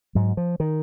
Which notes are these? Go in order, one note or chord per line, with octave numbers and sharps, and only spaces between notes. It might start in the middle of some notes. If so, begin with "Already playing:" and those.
G#2 F#3
F3
D#3